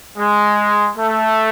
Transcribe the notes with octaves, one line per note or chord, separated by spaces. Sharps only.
G#3
A3